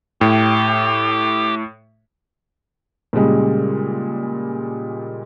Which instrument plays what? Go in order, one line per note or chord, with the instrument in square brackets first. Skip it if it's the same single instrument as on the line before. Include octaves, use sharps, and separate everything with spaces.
[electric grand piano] A2 [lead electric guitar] G4
[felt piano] A#2 C#3 G3 G#3